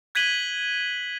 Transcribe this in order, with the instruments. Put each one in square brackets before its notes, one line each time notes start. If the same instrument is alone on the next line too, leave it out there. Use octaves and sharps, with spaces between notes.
[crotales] F#6 G#6 B6 D#7 F#7 G7